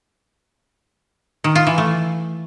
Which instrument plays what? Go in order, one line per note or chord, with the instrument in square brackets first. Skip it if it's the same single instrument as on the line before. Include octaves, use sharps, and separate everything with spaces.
[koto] D#3
F4
E3
A3